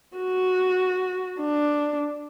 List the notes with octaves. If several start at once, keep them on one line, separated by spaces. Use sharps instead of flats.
F#4
D4